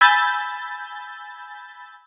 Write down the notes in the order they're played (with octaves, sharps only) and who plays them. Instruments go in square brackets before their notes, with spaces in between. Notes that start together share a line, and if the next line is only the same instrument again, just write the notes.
[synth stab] G#5 B5 E6 G6 A6